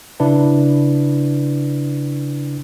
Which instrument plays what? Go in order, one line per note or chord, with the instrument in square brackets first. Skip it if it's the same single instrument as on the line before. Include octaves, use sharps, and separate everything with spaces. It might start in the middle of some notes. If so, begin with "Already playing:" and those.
[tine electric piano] C#3 D4 E4 B4